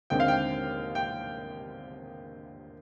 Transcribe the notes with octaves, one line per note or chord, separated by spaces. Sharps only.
D#2 D3 G#3 C4 G5
F5
G5
G5